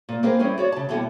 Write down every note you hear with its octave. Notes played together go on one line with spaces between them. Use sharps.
A#2
A#3 C4 G#4 A#4 B4
G3 C4 C#4 E4 G#4
F#4 C#5 D5
C#3 A5
D#2 B2 G3 E4 A4 F#5